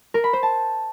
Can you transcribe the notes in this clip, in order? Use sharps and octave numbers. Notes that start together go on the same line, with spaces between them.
A#4
B5
C5
A5